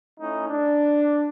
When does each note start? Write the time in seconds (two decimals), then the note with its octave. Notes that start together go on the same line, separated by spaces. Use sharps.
0.20 A3 C#4 D#4 E4
0.49 D4